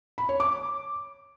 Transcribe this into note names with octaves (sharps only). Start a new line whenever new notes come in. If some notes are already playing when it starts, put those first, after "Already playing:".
B5
C#5
D6